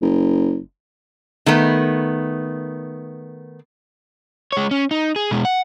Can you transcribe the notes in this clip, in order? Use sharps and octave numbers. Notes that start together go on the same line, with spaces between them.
F#1
D#3 A3 B3
G#3 C#5
C#4
D#4
G#4
B2 G#3
F#5